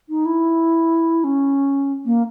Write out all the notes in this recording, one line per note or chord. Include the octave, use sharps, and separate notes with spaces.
D#4
E4
C#4
A#3